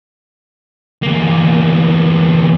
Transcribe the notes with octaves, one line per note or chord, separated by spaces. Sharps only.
E2 A#3